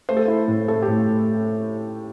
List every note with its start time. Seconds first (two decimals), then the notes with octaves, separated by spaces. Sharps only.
0.09 A3 C5
0.17 A4
0.25 E4 C5
0.48 A2
0.68 A3 A4
0.82 G4
0.88 A2